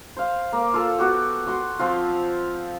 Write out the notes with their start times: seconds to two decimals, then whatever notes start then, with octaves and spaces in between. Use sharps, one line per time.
0.17 C5 F5
0.53 A#3
0.74 F4 A4
0.99 B3 F#4 G4
1.47 F#4 C6
1.79 F3 C4 F4